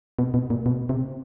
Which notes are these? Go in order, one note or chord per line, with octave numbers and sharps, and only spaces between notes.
B2
B2
A#2
B2
C3